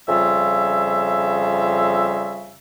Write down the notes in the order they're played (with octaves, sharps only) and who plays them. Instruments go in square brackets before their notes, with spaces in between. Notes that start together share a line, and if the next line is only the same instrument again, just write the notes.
[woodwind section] F2 C#3 G3 F4 E5